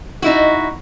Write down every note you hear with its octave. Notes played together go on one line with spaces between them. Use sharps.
D#4 E4 F#4